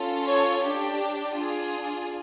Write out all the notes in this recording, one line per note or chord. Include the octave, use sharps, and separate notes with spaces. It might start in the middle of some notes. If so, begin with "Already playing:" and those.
Already playing: C#4 F4 A4
C#5
D4 G4
D4 F4 G#4